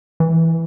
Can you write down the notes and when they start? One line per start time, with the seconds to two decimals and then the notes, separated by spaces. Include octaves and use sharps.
0.20 E3